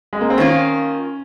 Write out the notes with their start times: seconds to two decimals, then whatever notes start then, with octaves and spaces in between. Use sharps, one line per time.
0.13 G#3
0.21 A#3
0.30 C4
0.37 D#3 A#3 C#4 F4